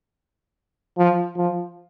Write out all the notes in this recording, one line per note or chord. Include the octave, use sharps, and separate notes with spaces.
F3
F3